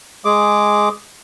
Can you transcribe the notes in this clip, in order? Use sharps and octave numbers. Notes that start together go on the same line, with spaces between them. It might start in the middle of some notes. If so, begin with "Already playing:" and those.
G#3 G#4 D6